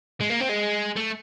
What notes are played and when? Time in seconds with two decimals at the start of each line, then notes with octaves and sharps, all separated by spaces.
0.21 G#3
0.30 A#3
0.40 C4
0.49 G#3
0.96 A3